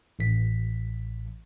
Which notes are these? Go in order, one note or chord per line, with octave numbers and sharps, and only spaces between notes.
A1 B6